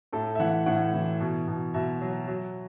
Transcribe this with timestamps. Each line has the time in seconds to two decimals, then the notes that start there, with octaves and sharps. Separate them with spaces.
0.13 A2 A4
0.35 E5
0.40 E3 F#5
0.66 A2 F#5
0.94 E3
1.20 B2
1.48 B2
1.74 B2 E5
2.01 F#3
2.27 F#3